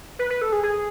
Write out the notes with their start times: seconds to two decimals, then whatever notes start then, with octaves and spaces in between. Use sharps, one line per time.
0.19 B4
0.30 B4
0.42 A4
0.52 G#4
0.63 G#4